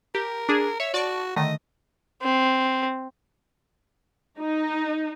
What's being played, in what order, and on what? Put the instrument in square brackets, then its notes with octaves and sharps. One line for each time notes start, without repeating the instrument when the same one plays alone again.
[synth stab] G4 [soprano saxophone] A#4
[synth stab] D4 G#4
[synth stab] C#5 [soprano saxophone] E5
[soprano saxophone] F#4 [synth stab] D5 A5 C#6
[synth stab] D3 D#3 A3 [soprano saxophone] D#5
[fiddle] C4
[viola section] D#4